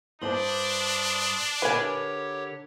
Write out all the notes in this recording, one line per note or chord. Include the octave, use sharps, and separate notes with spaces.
G2 D4 C5 A5 B5 C6 D#6
D3 G4 A#4 B4 C#5 G#5